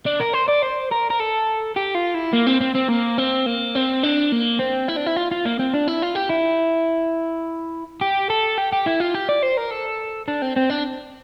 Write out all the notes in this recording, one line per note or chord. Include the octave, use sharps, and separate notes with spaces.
D4
A#4
C5
D5
C5
A#4
A#4
A4
G4
F4
E4
A#3
C4
C4
C4
A#3
C4
A#3
C4
D4
A#3
C4
E4
D4
E4
F4
F4
A#3
C4
D4
E4
F4
G4
E4
G4
A4
G4
G4
E4
F4
G4
D5
C5
A#4
A4
D4
C4
C4
D4